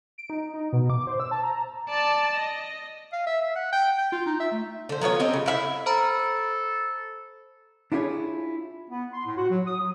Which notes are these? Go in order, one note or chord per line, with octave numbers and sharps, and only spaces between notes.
D7
D#4
D#4
B2
D6
C5
E6
A5
A#5
D5 A5
D#5
F5
E5
E5
F#5
G5
G5
F4
D#4
E5
A3
D3 C5
F#3 B3 F4 C#5
C4 C#4 G4 D#5
C#3
E4 F4 E5
A4 C5 A#5 B5
D4 E4 F4 G4 G#4 C#5
B3
C6
A2
F#4
F#3
D#6
F#3